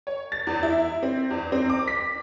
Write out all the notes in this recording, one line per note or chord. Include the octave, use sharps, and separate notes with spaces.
C#5
A6
E2
E4
C4
E2
C4
D6
B6